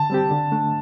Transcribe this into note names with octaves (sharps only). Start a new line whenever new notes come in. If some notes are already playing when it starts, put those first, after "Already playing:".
Already playing: D3 A5
G3 C4 G4
D3
A3 D4